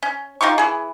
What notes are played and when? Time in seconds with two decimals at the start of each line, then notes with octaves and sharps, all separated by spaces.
0.03 C#4
0.41 D#4 F4 G4 C#6
0.58 E3 G#4